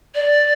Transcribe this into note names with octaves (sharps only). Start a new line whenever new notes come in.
D5